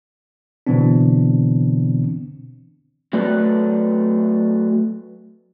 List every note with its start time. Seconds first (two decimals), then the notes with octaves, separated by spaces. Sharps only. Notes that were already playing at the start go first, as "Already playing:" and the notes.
0.67 B2 D3 E3 B3 C4 D4
3.13 F#3 A3 A4 B4 D5